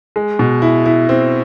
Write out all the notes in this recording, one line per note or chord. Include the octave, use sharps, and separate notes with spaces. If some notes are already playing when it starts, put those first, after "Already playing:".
G#3
B2
E4
E4
C4